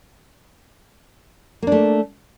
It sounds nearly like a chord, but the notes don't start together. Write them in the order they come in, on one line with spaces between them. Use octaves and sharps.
A#3 D4 A3